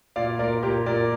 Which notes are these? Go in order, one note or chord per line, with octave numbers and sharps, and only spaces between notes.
A#2 D5 F5
A#2 A#4 D5
A#2 G4 A#4
A#2 A#4 D5